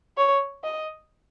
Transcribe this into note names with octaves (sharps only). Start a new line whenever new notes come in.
C#5
D#5